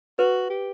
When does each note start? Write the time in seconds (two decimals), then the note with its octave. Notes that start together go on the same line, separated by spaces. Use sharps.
0.19 F#4 B4
0.50 G4